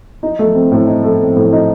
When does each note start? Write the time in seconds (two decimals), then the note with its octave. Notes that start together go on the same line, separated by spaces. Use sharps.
0.23 D#4
0.39 A3
0.55 C4
0.72 A2
0.87 D#4
1.04 A3
1.20 C4
1.36 A2
1.52 D#4